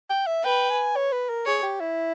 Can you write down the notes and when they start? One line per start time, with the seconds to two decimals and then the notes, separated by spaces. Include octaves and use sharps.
0.10 G5
0.27 E5
0.44 B4 G5
0.70 G#5
0.96 C#5
1.12 B4
1.29 A#4
1.46 G#4 C#5
1.63 G4
1.80 E4